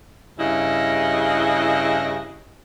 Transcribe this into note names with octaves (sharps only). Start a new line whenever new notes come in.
G2 C#3 E4 D#5